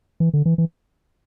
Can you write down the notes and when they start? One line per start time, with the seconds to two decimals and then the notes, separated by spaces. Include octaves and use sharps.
0.20 E3
0.34 D3
0.46 E3
0.58 E3